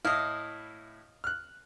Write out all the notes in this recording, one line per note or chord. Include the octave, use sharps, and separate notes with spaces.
A2 E4 D#5 F5
F6 F#6